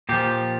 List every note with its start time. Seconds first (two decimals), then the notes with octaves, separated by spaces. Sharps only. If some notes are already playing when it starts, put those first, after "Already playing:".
0.09 A#2 F3 G4